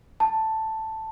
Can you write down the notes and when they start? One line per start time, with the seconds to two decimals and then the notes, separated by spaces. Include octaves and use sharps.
0.20 A5